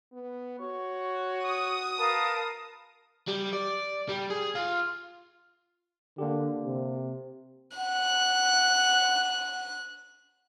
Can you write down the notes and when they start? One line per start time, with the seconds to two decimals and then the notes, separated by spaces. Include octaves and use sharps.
0.13 B3
0.60 F#4 C#5
1.44 D#6
1.98 A#4 B4 F5 A5
3.28 G3
3.53 D5
4.09 G3
4.30 G#4
4.55 F4
6.18 D3 A#3 G4
6.65 C3
7.78 F#5 F#6